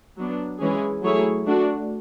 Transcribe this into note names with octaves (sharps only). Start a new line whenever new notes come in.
F#3 B3 D4
E3 G#3 C#4 G#4
F#3 A3 E4 G#4 C#5
A3 D4 F#4